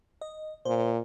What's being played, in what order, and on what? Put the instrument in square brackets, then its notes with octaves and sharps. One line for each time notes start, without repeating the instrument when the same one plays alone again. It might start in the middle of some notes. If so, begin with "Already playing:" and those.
[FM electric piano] D#5
[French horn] A#2 [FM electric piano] C5